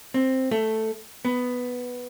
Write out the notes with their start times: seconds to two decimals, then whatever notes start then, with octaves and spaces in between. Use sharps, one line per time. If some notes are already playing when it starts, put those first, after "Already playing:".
0.14 C4
0.51 A3
1.25 B3